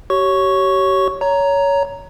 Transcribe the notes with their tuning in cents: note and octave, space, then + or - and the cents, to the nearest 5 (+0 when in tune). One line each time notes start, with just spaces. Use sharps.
G4 -35 C#5 +0 C#6 +0
C#5 +20 A#5 +0